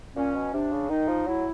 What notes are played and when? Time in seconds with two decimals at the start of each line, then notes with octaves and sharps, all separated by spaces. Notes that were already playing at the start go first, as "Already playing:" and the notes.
0.16 A#2 C#4
0.35 B2
0.54 C3 D4
0.72 C#3
0.90 D#3 D#4
1.08 F3
1.27 F#3 E4